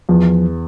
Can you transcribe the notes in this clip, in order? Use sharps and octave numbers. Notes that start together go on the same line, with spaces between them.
E2 F3